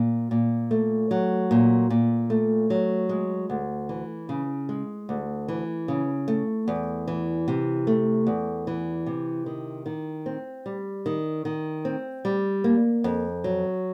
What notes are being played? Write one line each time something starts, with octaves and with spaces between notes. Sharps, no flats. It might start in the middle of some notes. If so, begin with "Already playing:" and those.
Already playing: A#2
A#2
A3
F#3
A#2
A#2
A3
F#3
G#3
D2
E3
C#3
G#3
D2
E3
C#3
A3
E2
E3
C3
A3
E2
E3
C3
D#3
D#3
C4
G3
D#3
D#3
C4
G3
A#3
F2
F#3